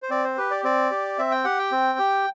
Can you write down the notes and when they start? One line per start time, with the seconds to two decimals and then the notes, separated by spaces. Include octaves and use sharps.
0.03 C5
0.10 C4 D5
0.24 C5
0.37 G4 B4
0.51 D5
0.64 C4 D5
0.91 G4
1.18 C4 E5
1.31 G5
1.44 G4 F#5
1.59 G5
1.72 C4
1.99 G4